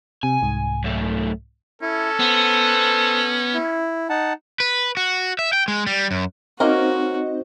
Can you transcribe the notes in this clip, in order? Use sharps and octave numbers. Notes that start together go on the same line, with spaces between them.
C3 G#5
C2 G#2
F#2 A3
C#4 E4 A4
B3 C5
E4
D#4 F#5 A5
B4
F#4
E5
G5
G#3
G3
F#2
A#3 C4 C#4 D#4 F#4 A#4 C5 D#5